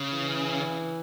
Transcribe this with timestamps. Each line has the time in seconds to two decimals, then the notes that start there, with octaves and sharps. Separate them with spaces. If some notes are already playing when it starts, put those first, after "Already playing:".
Already playing: C#3
0.13 E3